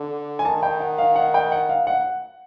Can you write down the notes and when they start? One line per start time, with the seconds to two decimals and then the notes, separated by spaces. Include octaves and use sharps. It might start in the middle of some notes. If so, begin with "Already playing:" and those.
Already playing: D3
0.39 G#5
0.45 D#3 A5
0.63 G5
0.80 F#5
0.98 F5
1.16 F#5
1.34 G5
1.52 F#5
1.69 F5
1.87 F#5